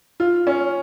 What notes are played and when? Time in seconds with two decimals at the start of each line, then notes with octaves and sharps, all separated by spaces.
0.20 F4
0.47 C#4